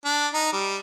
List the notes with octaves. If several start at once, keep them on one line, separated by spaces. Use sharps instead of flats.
D4
D#4
G3